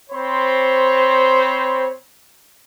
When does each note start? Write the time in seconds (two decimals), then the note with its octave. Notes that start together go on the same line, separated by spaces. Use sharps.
0.11 C4 C5 C#5 B5